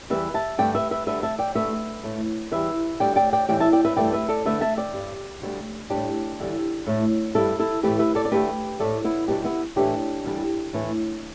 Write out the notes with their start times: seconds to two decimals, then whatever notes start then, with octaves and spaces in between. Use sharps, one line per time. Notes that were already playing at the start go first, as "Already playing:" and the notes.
0.10 E2 E3 G3 B4 E5
0.34 E5 A5
0.58 G2 D3 A3 D5 G5
0.75 B4 E5
0.91 B4 E5
1.06 D2 D3 G3 B4 E5
1.23 E5 A5
1.39 D5 G5
1.55 D2 D3 A3 B4 E5
2.03 A2 A3
2.51 E2 E3 G3 B4 E5
3.00 D2 D3 G3 D5 G5
3.16 D5 G5
3.33 D5 G5
3.49 A2 E3 G3 D5 G5
3.60 E5 A5
3.73 D5 G5
3.85 B4 E5
3.96 G2 E3 A3 D5 G5
4.13 B4 E5
4.29 A4 D5
4.45 D2 D3 A3 B4 E5
4.61 E5 A5
4.77 D5 G5
4.94 G2 G3
5.42 D2 D3 G3
5.90 A2 G3 D4 G4
6.39 E2 D3 G3
6.87 A2 A3
7.35 G2 G3 E4 A4
7.59 E4 A4
7.83 A2 E3 A3 G4 B4
7.99 B4 E5
8.15 A4 D5
8.25 D5
8.32 D2 D3 A3 G4 B4
8.80 A2 A3 A4 D5
9.04 B3 E4
9.28 E2 B2 G3 D4 G4
9.44 B3 E4
9.76 A2 E3 A3 D4 G4
10.25 E2 D3 G3
10.73 A2 E3 A3